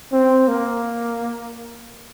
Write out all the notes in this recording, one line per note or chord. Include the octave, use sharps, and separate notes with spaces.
C4
A#3